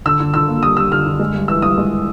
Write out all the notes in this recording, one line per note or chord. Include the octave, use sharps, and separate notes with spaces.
D3 E6
D3
D3 E6
A#3
G3 D#6
G3 E6
D3 F6
D3
G#3
G2
E3 E6
G2 D#6
G#3